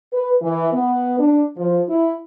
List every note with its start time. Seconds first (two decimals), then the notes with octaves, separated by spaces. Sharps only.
0.13 B4
0.42 E3
0.73 B3
1.19 D4
1.57 F3
1.88 E4